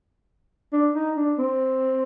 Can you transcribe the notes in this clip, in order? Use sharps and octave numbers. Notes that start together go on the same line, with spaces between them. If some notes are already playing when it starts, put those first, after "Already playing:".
D4
D#4
D4
C4